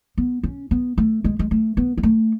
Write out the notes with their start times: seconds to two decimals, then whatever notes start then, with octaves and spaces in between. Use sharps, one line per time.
0.18 B3
0.43 C#4
0.71 B3
0.98 A3
1.24 G#3
1.39 G#3
1.51 A3
1.77 B3
1.97 G#3
2.03 A3